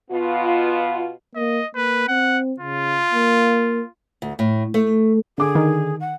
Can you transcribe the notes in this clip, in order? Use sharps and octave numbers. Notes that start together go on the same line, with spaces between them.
B2 B3 F4
A#3 D#5
A#3 B4
C4 F#5
C#3 F4
A#3
D2
A2
A3
D3 G#4 D6
D#3
F#5